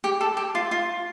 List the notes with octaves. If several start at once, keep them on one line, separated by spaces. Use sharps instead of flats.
G4
A4
G4
F4
F4